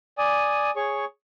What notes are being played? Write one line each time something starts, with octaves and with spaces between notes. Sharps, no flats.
D5 G#5 D#6
G#4 C#5 C#6